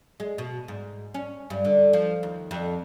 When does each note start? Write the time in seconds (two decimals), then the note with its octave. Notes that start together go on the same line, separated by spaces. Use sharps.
0.20 G#3
0.38 B2
0.68 G#2
1.14 C#4
1.50 G2
1.65 D3
1.93 F3
2.23 D#2
2.51 F2